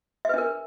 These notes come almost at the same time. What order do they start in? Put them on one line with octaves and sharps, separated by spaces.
E5 B4 D4 A#4